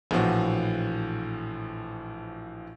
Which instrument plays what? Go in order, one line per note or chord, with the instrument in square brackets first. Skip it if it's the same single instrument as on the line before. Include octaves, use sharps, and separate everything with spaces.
[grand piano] A#1 A2 E3 F3 F#4